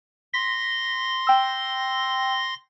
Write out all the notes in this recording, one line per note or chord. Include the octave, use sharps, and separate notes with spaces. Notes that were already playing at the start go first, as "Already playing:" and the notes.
C6 A#6 B6
G5 E6